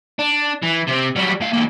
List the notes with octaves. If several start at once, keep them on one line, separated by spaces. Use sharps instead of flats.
D4
E3
C3 C4
F#3 G3
A2 F5
C#2 A#3